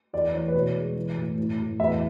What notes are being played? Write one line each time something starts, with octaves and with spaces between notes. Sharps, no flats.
E2 D5
E3 C#5
B4
B2 C#5
G#3
E3
A2
A2
A2
E2 E5